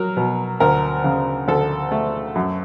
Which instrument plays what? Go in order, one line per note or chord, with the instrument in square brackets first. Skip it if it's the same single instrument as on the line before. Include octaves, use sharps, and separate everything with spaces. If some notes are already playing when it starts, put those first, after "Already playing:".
Already playing: [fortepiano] F#3 A#4
B2
D2 A#4
C#3
D2 A4
A3
F#2